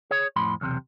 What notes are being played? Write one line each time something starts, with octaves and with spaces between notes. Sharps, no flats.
G#4 C#5
F2 A2 B5 C6
B1 E2 C3